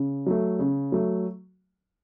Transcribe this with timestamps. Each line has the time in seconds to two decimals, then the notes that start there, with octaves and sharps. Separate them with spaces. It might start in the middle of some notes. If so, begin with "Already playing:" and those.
Already playing: C#3
0.26 F#3 A3
0.59 C#3
0.92 F#3 A3